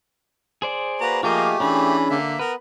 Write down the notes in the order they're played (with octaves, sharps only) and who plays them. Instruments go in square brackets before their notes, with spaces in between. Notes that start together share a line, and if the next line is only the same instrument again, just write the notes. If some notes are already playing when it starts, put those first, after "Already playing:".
[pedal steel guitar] G#4 C5 D5
[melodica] A#3 F#4 [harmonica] B4 A#5
[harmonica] F3 A#3 A#4 [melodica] A3 G4 [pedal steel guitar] F4 G#4 D#5
[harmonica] E3 B5 [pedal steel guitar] C#4 D4 G#4
[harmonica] D3 [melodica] A#3 E5
[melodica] B3 [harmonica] A#4 [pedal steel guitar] B4